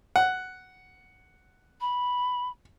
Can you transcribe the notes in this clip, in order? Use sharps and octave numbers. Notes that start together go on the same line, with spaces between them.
F#5
B5